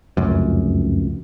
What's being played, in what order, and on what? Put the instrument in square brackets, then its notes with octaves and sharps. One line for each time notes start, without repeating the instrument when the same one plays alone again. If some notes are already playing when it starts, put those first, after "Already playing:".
[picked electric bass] F1 C#2 F#2